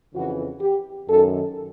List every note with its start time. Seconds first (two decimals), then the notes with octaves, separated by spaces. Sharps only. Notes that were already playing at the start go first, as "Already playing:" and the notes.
0.15 F2 C#3 E3 F#4
0.61 G4
1.08 F#2 D#3 A4